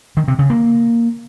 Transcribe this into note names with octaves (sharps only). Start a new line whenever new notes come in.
D#3
C3
C#3
A#3